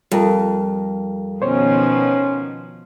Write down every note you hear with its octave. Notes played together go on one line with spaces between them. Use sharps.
F2 G3 A#4
B2 D#3 F3 C#4 C5 C#5